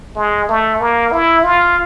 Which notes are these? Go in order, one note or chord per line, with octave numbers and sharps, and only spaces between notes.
G#3
A3
A#3
E4
F4